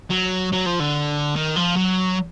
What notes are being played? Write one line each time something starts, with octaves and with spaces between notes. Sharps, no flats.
F#3
F#3
F3
D3
D#3
F3
F#3